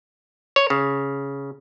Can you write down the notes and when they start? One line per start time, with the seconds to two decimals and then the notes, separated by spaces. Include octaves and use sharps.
0.56 C#5
0.70 C#3